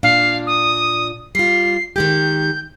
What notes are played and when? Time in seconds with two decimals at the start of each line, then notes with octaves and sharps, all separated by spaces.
0.03 A#2 D4 F5
0.47 D#6
1.35 G3 F4 C7
1.96 D#3 G#3 G4 G6